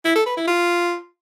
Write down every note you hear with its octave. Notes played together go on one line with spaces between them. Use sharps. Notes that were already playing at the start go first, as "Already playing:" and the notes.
E4
A4
B4
E4
F4